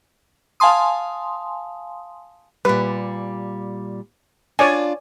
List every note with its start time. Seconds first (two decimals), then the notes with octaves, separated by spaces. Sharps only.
0.60 F5 G#5 A5 C6 D#6
2.65 A#2 G3 B4
4.59 D4 F4 C#5 D5 G#5